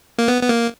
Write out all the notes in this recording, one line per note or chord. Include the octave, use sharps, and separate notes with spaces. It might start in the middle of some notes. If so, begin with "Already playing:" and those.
A#3
B3
B3
A#3